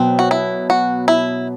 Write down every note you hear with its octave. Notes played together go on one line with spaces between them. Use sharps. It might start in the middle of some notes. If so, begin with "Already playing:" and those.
Already playing: B2 F#3 B3 C4
F#4
E4
F#4
E4